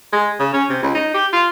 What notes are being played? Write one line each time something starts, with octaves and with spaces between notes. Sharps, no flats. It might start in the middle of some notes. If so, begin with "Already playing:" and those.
G#3
C#3
C#4
C3
C#2
D#4
G4
F4